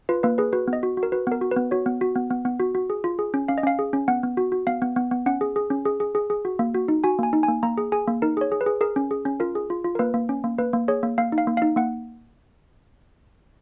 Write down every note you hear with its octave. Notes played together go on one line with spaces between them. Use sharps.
F4 B4
A#3 B4
G#4 B4
F#4 B4
B3
D#5
F#4
F#4
A#4
F#4 B4
B3 A#4
F#4
B4
B3
F#4 C#5
B3
F#4
B3
B3
B3
F#4
F#4
G#4
F4
G#4
C#4
C#4 F5
D#5
C#4 F5
G#4
C#4
B3 F#5
B3
F#4
F#4
B3 F5
B3
B3
B3
C#4 F#5
G#4
G#4
C#4
G#4
G#4
G#4
G#4
F#4
A#3
F#4
D#4
F#4 G#5
A#3 G#5
D#4
G#5
A#3
A#3 A#5
G#4
G#4 G#5
A#3
D#4 A#4
G#4 C#5
G#4
B4
G#4
G#4 A#4
C#4
G#4
C#4
F4 A#4
G#4
F4
F4
A#4
A#3 B4
A#3
C#4
A#3
A#3 B4
A#3
G#4 C#5
A#3
A#3 F5
D#4
F5
A#3
D#4 F5
A#3 F#5